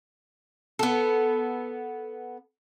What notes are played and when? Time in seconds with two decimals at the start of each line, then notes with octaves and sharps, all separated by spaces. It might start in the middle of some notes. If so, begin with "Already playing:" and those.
0.79 B3 A4